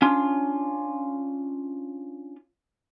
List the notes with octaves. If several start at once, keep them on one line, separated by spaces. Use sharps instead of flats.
C#4 D4 F4